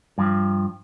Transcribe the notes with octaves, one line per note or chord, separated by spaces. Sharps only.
G2 F3